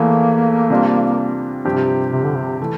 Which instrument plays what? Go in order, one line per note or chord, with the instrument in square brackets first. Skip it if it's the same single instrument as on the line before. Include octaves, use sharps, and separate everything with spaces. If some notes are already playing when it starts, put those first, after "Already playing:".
Already playing: [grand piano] E2 E3 A3 [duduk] A#3
[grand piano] C3 G3 D4 F4
[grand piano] G2 F3 C4 G4 [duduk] C3
[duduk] C3
D3
C3
[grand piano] E3 A3